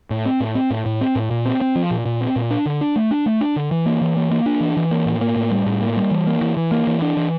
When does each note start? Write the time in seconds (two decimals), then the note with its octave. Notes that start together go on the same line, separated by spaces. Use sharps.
0.10 A2
0.26 C4
0.40 A2
0.55 C4
0.70 A2
0.86 A2
1.01 C4
1.15 A2
1.31 A#2
1.45 C4
1.61 C4
1.75 F3
1.91 A#2
2.06 A#2
2.21 C4
2.36 A#2
2.50 D4
2.66 D3
2.81 D4
2.96 A3
3.11 D4
3.26 A3
3.41 D4
3.56 D3
3.71 E3
3.86 A#3
4.01 E3
4.16 A#3
4.31 A#3
4.46 D4
4.61 E3
4.77 E3
4.91 A#3
5.06 A2
5.21 A#3
5.36 A2
5.51 G3
5.66 A2
5.81 A#3
5.97 G3
6.11 E3
6.26 A#3
6.41 E3
6.57 E3
6.71 A#3
6.87 E3
7.02 D4
7.17 E3